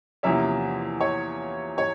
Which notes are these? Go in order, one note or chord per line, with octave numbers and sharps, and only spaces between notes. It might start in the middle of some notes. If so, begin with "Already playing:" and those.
E2 C3 F3 A#3 C#4 E5
C#5
C#5